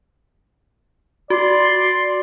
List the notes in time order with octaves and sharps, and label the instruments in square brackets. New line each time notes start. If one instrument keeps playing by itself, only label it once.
[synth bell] F#4 [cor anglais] D5 [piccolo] C6